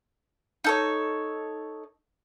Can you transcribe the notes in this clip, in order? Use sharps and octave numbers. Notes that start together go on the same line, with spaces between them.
D#4 A4 C#5